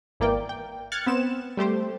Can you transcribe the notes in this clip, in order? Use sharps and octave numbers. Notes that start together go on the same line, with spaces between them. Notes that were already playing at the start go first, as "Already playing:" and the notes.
G#1 E3 A#3 D5 G5
G5
F6 F#6 G#6 A6 C#7
B3 C4 E7
G3 A3 G4 C5